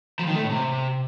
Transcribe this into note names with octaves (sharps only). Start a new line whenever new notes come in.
F3
D#3
A3
A2
C3